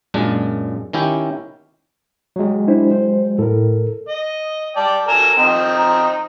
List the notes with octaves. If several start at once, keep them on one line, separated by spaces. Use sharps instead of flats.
F#2 A#2 G#3 D4
D#3 C#4 E4 G4
F#3 G#3
D4 E4 C5
C5
A2 A4 A#4
D#5
D5 G5 A5
A4 A#4 G#5 E7
F3 C4 D#4
A#5